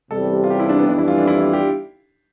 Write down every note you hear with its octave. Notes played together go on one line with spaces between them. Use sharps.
E2 C3 G3 A4
F4
G4
E4
D4
B3
F2 E3 G3 D4
E4
F4
D4
E4
F4
G4